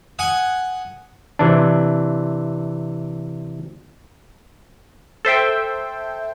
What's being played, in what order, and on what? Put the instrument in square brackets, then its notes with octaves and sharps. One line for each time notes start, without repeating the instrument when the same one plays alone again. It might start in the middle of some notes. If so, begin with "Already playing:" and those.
[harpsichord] F#5 G#5 D#6
[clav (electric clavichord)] C3 E3 D4
[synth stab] A4 C5 E5 G5